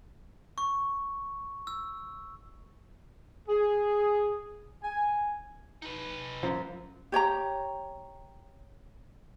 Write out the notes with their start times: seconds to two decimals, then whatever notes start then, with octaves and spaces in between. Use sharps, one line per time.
0.58 C#6
1.67 E6
3.49 G#4
4.84 G#5
5.82 D#4 B4
6.43 F#2 F3
7.12 G4 C#5 G5 A#5